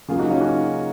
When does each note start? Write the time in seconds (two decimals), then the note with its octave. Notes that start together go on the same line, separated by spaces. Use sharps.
0.08 C#3 F#3 A#3 F4 G#4
0.19 D#4 F#4
0.30 C#4 F4
0.41 D#4 F#4